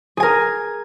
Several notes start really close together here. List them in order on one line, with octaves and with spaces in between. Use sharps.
G#4 G#5 A#4